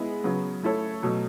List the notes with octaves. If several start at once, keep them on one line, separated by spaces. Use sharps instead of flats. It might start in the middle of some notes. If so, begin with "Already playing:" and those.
Already playing: G#3 B3 E4 G#4
C#3 F#3 B3
A3 E4 A4 C#5
B2 F#3 A3